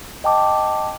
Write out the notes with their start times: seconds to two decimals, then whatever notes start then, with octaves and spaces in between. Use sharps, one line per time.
0.24 D#5 G5 A5 D6